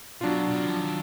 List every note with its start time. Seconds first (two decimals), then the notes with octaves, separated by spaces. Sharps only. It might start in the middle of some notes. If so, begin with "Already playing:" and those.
0.21 B2 F#3 D4 F4
0.50 B2
0.68 F3
0.79 D#3